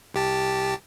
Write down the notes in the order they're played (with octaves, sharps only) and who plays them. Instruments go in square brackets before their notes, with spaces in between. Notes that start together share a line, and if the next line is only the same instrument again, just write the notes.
[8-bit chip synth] C2 G4 A5